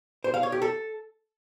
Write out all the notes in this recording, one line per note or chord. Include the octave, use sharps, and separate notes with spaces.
C5
F5
C#5
G4
A4